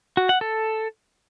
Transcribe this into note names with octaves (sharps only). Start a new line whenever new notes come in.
F#4
F#5
A4